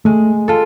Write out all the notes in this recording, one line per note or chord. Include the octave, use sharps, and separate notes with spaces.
G#3 A3
F4 A4